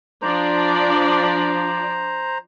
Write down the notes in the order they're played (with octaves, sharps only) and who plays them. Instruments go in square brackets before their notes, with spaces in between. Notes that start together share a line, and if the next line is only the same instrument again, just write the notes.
[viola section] F3 D4 D5 [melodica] C5 A#5